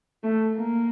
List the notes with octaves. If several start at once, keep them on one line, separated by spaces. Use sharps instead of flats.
A3
A#3